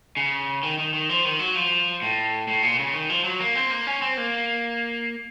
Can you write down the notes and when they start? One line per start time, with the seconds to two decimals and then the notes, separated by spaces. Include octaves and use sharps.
0.17 C#3
0.63 D#3
0.79 D#3
0.94 D#3
1.09 F3
1.25 D#3
1.39 F#3
1.55 F3
2.02 A2
2.48 A2
2.62 A#2
2.79 C#3
2.93 D#3
3.10 F3
3.24 F#3
3.40 A#3
3.55 C4
3.71 A#3
3.87 C#4
4.02 C4
4.17 A#3